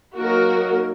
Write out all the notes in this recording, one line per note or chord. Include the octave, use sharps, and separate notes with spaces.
F#3 A#3 D#4 F#4 A#4